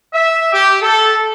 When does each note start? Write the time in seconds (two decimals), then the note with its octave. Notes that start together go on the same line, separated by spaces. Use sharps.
0.13 E5
0.53 G4
0.82 A4